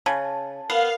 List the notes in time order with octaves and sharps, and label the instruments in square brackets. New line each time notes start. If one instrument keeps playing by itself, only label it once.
[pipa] C#3 [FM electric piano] A5
[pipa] B3 [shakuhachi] A#4 [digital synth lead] F5